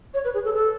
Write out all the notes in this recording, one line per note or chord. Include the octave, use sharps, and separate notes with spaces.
C#5
B4
G#4
A4
A4